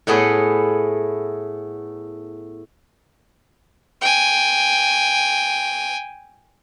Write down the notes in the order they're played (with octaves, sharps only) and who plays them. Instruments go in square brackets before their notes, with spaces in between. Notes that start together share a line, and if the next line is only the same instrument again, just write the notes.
[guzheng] A2 A3 B3 G#4
[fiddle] G5 G#5